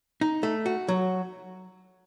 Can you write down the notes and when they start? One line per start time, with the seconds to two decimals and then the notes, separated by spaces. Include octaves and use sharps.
0.21 D#4
0.43 A3
0.66 F#4
0.88 F#3